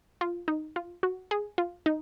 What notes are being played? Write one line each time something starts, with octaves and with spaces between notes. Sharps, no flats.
F4
D#4
F4
F#4
G#4
F4
D#4